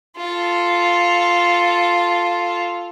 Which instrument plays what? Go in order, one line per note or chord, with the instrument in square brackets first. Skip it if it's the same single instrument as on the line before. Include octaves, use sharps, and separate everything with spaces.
[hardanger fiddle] F4 A4